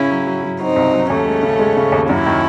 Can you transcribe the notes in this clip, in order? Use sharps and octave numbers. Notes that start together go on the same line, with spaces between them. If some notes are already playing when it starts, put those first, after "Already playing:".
Already playing: C#3 C#4 E4
F#3
F#3
F#3
F#3 C4 D#4
C2
F#3
D#2 A3 C#4
G#3
C#3
G#3
C#3
D#2
F#2 C#4 E4
D#3